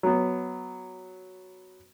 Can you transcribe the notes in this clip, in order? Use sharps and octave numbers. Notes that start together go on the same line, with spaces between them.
F#3 B3